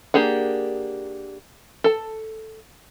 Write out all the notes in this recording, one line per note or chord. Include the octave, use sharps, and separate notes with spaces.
A#3 D4 G4 G#4 F#5
A4 A5